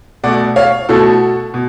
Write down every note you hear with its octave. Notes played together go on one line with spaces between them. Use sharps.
B2 A3 D5 F#5
C#5 F5
B2 A3 F#4 A4
B2